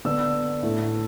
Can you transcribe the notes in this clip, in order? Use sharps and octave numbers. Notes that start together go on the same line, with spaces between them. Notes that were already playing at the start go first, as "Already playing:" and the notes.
D3 B3 D4 E6
A2 A3 E4